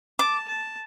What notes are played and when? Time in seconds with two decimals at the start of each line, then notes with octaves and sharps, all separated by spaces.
0.19 A5 D6
0.48 A5